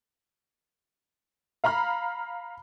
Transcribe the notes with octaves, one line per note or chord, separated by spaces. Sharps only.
F5 A#5 B5 F6